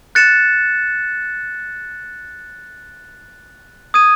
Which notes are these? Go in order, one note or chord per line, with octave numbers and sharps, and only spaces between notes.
F#6 A6 C#7 E7
D#6 G#6 D#7